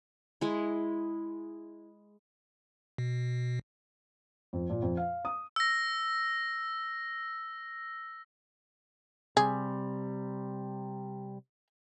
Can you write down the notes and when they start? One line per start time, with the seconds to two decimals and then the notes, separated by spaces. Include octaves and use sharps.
0.41 G#3 E4
2.98 B2
4.53 F2
4.70 A#2
4.82 F2
4.97 F5
5.25 D#6
5.56 E6 A#6
9.37 C3 G3 G#4